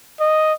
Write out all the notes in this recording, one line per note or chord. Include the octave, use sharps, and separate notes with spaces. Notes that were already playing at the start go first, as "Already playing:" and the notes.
D#5